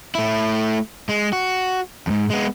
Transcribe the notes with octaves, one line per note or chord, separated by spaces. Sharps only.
A3 E4
G#3
F#4
F2 G#2
G#3 B3